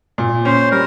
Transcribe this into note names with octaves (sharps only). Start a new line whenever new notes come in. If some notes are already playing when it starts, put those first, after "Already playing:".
A#2
C#4 C5
G3 A#4